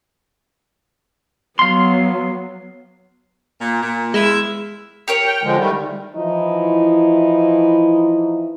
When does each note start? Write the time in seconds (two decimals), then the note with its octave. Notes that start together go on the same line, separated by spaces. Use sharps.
1.59 F#3 B3 F5 C6
3.60 A#2
3.81 A#2
4.14 E2 G#3 E4 E5
5.08 G4 A#4 C#5
5.26 G5
5.44 D3 F3 G#3
5.58 D#3 G3 A3
6.16 E3 F3 D#4 E4